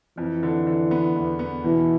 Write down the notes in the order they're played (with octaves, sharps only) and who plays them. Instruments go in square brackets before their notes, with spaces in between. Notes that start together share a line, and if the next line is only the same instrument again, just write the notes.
[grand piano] F2 [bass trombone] E3
[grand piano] D3
D3
B3
E2
B3
[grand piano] B2 [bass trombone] E3